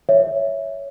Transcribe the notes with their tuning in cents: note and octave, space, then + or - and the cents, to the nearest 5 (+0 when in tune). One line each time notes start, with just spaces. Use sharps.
C#5 +5 E5 +0